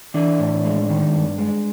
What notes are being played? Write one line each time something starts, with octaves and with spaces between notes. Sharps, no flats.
E3 D4
A2
G#3
D#3
G2
G#3